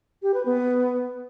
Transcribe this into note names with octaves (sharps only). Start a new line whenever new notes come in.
G4
B4
B3